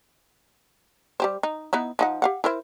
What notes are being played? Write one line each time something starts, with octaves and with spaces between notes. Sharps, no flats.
G3 G4 C5
D#4
B3 D#4 E4
F3 D#4 F#5
G4 F5 F#5
E4 A#4 C5